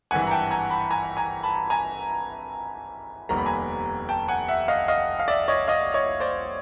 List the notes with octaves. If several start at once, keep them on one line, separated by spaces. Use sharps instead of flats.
G#1 G2 E3 F#5 G#5
A#5
G5 A5
G#5 A#5
A5 B5
G#5 A#5
G#5 A#5
A5 B5
G#5 A#5
F1 D#2 D#3 G3 B3 A#5
B5
G#5 A#5
G5 A5
F#5 G#5
E5 F#5
D#5 F5
D#5 F5
F5
D5 E5
C#5 D#5
D#5 F5
C#5 D#5
C5 D5